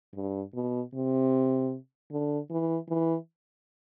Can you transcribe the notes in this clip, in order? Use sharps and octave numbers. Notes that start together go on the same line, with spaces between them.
G2
B2
C3
D3
E3
E3